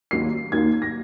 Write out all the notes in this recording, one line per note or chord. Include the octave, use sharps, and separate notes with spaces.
D#2 D#3 F#3 A#3 C7
D#2 D#3 F#3 A#3 G#6
A#6